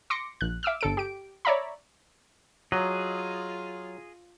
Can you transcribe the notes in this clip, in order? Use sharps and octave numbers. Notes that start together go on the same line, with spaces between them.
C6 D6 A#6 C#7
A#1 F#6
E5 D6 E6 F6
G1 A4 D7
G4 D7
C#5 D5 E5 A#5 B5
F#3 F4 G#4 D#5